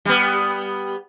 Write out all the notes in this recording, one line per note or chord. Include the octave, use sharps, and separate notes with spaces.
G3 B3